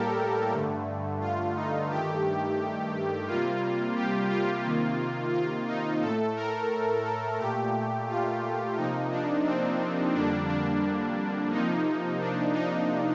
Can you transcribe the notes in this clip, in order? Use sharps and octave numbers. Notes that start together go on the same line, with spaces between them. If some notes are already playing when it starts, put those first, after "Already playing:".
Already playing: A2 G3 A#3 G4 A4 A#4
G2 D3 A3
F4
D#4
G2 D#3 A3 G4
C3 G3 A#3 F4
G4
F4
C3 D#3 A#3
F4
D#4
A2 A3 A4
A#4
A4
A#2 A3 G4
F4
C3 F3 A#3 D#4
D4
C4
F2 D3 G3 A#3 D4
D4
C3 F3 A#3 D#4
D4
D#4